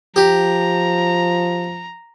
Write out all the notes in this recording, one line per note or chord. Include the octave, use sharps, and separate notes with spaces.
F3 G4 A#5